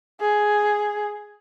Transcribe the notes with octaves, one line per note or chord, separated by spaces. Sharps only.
G#4